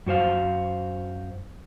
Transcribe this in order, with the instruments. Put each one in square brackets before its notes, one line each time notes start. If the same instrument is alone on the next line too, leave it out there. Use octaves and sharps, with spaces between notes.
[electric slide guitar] F#2 F#4 C5 F5